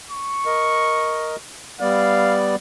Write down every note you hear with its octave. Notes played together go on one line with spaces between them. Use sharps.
C#6
A#4 D#5
G3 B3 D5 F5